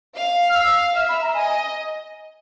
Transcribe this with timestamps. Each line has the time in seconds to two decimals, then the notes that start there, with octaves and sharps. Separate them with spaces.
0.16 F5
0.49 F6
0.55 E6
0.95 E5 F6
1.09 B5
1.22 A#5
1.35 D#5 G#5